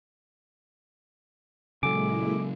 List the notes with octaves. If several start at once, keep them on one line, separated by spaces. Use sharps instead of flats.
A#2 C#3 F#3 G#3 E4 A4 G#5 D6